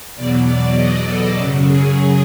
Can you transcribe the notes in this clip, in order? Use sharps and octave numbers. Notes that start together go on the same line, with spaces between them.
E2 B2 F#3 D5
D5
D#5
A4
F#2 C#3 F#3
G#4